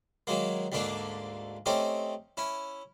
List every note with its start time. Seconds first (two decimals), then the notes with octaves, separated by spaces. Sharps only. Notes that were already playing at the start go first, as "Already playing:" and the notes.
0.27 D#3 F#3 G#3 A#3
0.72 D2 G#2 A3 A#3 D4
1.66 A3 C4 C#4 D#4 G4
2.37 C#4 E4